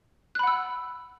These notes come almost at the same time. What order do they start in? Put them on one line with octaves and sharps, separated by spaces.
F#6 B5 F#5 E6